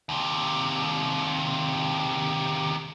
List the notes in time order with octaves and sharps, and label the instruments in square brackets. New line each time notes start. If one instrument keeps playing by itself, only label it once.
[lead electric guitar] D#2 C3